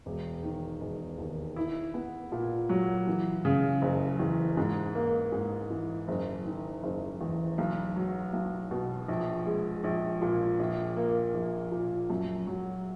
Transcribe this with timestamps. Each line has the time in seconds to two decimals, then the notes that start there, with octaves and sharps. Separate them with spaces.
0.06 E1
0.43 D#3
0.81 E1
1.18 D#2
1.56 E4
1.94 B3
2.32 A#2
2.69 F#3
3.07 E3
3.45 C#3
3.82 F#1
4.19 E2
4.57 G#2
4.95 A#3
5.32 G#2
5.70 E3
6.08 F#1
6.45 D#3
6.83 F#1
7.21 E2
7.58 B1
7.96 F#3
8.33 B1
8.71 B2
9.08 A#1
9.46 G#3
9.84 A#1
10.22 A#2
10.59 A#1
10.97 A#3
11.34 A#1
11.72 A#2
12.10 F#2
12.47 F#3